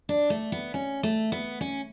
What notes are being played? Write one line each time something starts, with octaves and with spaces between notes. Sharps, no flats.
D4
A3
B3
C#4
A3
B3
C#4